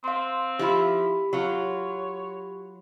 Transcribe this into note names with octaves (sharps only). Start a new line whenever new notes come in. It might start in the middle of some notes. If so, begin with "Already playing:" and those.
C4 F5 C6
F3 E4 F4 G4 B5
F#3 F4 C#5